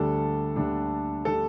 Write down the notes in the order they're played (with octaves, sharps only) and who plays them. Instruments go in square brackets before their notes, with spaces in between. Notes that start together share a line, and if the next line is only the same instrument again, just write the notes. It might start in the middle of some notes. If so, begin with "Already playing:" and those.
Already playing: [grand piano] D2 D3 G3 D4 A4
D2 D3 G3 D4
D3 G3 D4 A4